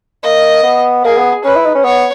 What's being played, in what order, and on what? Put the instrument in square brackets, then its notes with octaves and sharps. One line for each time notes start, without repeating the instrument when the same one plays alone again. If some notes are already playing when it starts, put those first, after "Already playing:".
[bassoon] A#3 [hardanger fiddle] D#5
[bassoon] B3
[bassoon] A#3 [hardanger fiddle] G#4
[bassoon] B3
[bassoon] C#4 [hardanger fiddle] B4
[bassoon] E4
D#4
C#4
[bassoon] B3 [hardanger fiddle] C#5